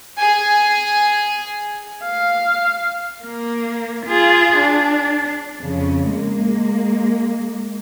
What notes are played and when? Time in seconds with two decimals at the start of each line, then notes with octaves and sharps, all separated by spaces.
0.17 G#4 G#5
2.04 F5
3.24 A#3
4.06 F4 G#4
4.58 D4
5.60 F2 C#3
6.13 G#3 A#3